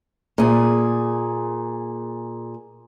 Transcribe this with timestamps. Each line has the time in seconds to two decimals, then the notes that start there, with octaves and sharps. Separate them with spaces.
0.38 A#2 G#4